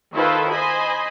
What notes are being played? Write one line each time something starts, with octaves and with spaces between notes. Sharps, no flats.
D#3 E4 F4 A4 B4 C5
C5 D#5 G#5 B5